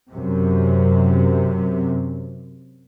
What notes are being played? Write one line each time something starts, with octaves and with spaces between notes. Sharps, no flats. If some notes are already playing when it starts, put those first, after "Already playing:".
F#2 C3